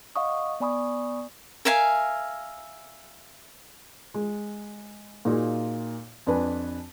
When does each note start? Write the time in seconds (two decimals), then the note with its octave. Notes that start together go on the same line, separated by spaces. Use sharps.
0.16 D#5 F5 F#5 C#6 D#6
0.60 B3 D5 G#5 B5 C#6 D#6
1.65 A#4 E5 F5 G#5
4.14 G#3
5.25 A#2 D#4 F4 F#4 G#4
6.27 F2 D4 B4 G#5